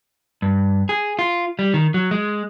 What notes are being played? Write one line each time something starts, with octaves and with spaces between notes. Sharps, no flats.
G2
G#4
F4
G3
D#3
F#3
G#3